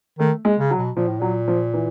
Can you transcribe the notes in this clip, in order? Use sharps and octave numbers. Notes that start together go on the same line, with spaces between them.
D#3 A3
G#3
C#3
F#3
B2
A#2 F3
A2
A#2 F#3
F3
E3